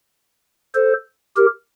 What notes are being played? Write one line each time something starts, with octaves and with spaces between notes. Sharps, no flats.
A4 C5
G4 A#4